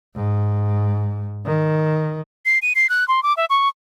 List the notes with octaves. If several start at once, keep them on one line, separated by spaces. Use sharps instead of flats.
G#2
D#3
C7
D#7
C7
F#6
C6
D6
E5
C#6